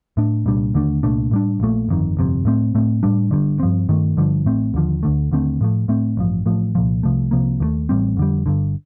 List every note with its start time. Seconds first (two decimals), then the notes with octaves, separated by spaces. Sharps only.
0.17 A2 A3 D4
0.46 C2 A#2 G3 D4
0.74 D#2 D3 A3 D4
1.03 C2 A#2 A3 D4
1.31 A2 G3 D4
1.60 A#1 A#2 A3
1.89 G1 F2 D#3
2.17 G1 F2 C3
2.45 A2 A3 C4
2.75 A2 A3 C4
3.03 A2 G3 D4
3.31 G1 G2 D3
3.60 G2 F3 C4
3.89 G2 D#3 A3
4.17 G1 G2 D3 F3
4.46 A1 A2 A3 C4
4.74 D#2 D3 F3
5.03 D2 D3 A3
5.32 D#2 D3 A3 C4
5.61 A2 F3 A3
5.88 A2 A3 C4
6.17 A1 G2 F3
6.46 A1 A2 F3 A3
6.75 C2 A#2 F3
7.03 C2 C3 F3 A3
7.31 C2 C3 F3 A#3
7.60 D#2 D#3 A3
7.89 A1 A2 G3 C4
8.17 F2 D3 G3
8.46 G1 G2 D3